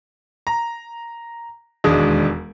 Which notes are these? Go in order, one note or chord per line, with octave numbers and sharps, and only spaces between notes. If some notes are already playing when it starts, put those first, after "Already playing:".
A#5
E1 D#2 G#3 D4 D#6